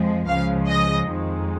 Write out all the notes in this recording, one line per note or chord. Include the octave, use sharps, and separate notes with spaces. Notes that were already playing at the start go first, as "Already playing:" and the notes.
Already playing: F2 F3 G#3
C#2 C#3 F3 G#3 F5
D#5
F2 D#3 G#3